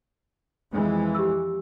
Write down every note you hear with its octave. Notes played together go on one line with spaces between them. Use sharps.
F2 E3 G#3
G4 E6